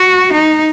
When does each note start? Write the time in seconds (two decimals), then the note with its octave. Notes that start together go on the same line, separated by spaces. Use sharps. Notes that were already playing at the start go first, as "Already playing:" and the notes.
Already playing: F#4
0.32 D#4